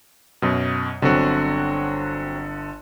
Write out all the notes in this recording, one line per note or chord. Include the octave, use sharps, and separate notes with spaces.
F#2 B2
G1 D3 F#3 C4 F#4